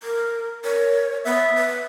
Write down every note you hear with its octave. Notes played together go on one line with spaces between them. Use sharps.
A#4
A#4 C#5
B3 E5
B4